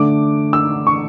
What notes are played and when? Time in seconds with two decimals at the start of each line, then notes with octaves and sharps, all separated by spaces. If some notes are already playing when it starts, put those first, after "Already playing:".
Already playing: D3 A3 D4 D6
0.53 E6
0.87 C#6